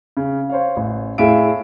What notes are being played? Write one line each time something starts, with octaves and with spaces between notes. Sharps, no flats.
C#3
C5 C#5 F5
A1
A2 G#4 E5 F5 D7